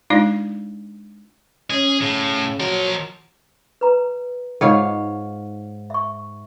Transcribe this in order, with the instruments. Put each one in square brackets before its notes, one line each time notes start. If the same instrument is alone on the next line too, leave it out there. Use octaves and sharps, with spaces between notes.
[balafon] G#3 D4 D#4 F4 D5
[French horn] C#4 [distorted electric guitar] G#4
[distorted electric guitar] A2 [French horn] C#3
[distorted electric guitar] F3 A#4 [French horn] F#3
[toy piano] B4 A#5
[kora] G#2 C#5 F5 [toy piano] D#4 F4 F#5
[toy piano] E5 C#6